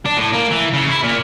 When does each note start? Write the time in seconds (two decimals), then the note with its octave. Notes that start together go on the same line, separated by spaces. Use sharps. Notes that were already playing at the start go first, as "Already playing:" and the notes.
0.06 D4
0.17 A2
0.33 A#3
0.51 E3
0.73 C#3
0.89 E4
1.03 A#2